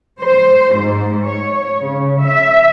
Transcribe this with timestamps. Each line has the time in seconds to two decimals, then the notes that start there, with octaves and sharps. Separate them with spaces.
0.20 C5
0.76 G#2
1.26 C#5
1.80 C#3
2.23 E5